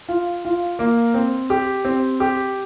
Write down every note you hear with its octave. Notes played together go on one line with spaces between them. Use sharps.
F4
F4
A#3
C4
G4
C4
G4